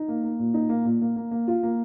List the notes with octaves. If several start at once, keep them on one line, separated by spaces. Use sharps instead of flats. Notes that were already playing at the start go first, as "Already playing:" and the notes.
Already playing: D#4
A#3
A#3
A#2
D#4
A#3
A#2
A#3
A#3
A#3
F4
A#3